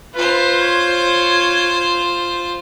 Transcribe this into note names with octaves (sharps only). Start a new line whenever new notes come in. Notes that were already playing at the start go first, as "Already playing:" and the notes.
F4 B4 C5
C#5